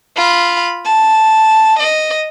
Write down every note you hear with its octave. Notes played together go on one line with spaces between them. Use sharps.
F4 B5
A5
D#5